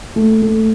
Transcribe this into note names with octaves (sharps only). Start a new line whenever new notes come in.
A3
A3